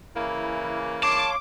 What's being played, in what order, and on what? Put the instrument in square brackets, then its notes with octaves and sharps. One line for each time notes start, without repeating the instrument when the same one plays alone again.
[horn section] C#3 E3 A#3 [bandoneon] E4
[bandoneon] C#5 F5 C6 [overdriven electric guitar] A5 [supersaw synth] D6